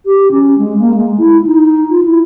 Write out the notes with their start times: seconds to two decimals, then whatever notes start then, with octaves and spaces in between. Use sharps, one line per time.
0.06 G4
0.31 C#4
0.58 G#3
0.80 A#3
0.94 G#3
1.18 E4
1.46 D#4
1.90 F4
2.04 E4